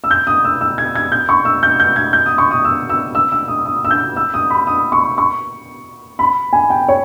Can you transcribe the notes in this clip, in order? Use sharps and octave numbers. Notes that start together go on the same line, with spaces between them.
E6
G6
D#6
E6
E6
G#6
G#6
G6
C#6
E6
G6
G6
G#6
G6
D#6
C#6
D#6
E6
E6
E6
E6
D#6
D#6
E6
G6
E6
D#6
B5
D#6
C#6
C#6
B5
G#5
G5
C#5